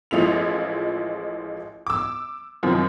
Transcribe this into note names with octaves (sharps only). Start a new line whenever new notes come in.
A1 F3 G#3 E4 F7
D6 E6
F#2 C3 D#3 F3